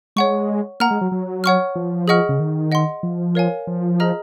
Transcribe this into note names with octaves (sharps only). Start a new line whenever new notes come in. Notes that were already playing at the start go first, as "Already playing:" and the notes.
G#3 C#5 F#5 C#6
A#3 F#5 A#5 F6
G#3
F#3
F#3
C#5 F#5 C#6 F6
F3
G#4 D#5 F#5 C#6 F6
C#3
D#3
D#5 F#5 C6
F3
A#4 C#5 F5 G#5
F3
G#4 D#5 A#5 F6